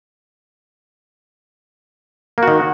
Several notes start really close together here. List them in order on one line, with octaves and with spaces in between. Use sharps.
A#3 F#4 D#3